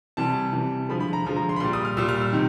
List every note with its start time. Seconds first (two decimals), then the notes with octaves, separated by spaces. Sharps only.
0.17 C3 E3 G3 A5
0.53 C3 E3 G3
0.89 D3 F3 G#3 B5
1.00 B5
1.13 A#5
1.25 D3 F3 G#3
1.36 A#5
1.49 C6
1.56 B5
1.60 A#2 G3 C6
1.73 D#6
1.85 F6
1.97 A#2 G3 E6
2.09 F6
2.21 E6
2.33 C3 D#3